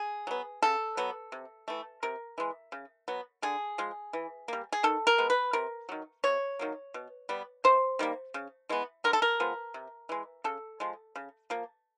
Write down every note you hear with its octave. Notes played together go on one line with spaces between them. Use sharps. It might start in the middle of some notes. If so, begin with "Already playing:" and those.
Already playing: G#4
F#3 B3
C#3 A4
F#3 B3
C3
E3 A3
C3 A#4
E3 G#3
C#3
F#3 B3
D3 G#4
F3 G#3
E3
G3 A#3
G#4
D#3 A4
A#4
G#3 B3
B4
C3 A#4
D#3 F#3
C3 C#5
D#3 F#3 A#3
B2
G3 B3
C3 C5
D#3 G3 A#3
C#3
E3 G#3 B3
D3 A#4
A4
A#4
F3 G#3 B3
C3
E3 G#3
C#3 A4
F3 G#3
C#3
F3 A#3